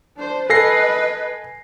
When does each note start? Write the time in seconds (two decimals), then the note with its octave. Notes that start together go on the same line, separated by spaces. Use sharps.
0.17 D4 C5
0.50 A4 B4 D#5 G#5 A#6 C7